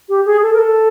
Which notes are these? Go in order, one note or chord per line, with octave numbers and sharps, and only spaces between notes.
G4
G#4
A4
A#4
A4